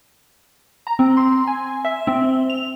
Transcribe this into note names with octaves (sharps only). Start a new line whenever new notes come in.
A#5
C4
C6
G#5
E5
C4
F7